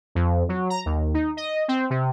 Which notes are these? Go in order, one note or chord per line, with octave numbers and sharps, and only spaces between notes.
F2
F#3
A#5
D#2
D#4
D#5
C4
C3